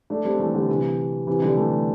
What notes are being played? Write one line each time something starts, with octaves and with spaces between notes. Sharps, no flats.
A3 D4
G3 C4
E3 A3
D3 G3
C3 E3
C3 E3
D3 G3
E3 A3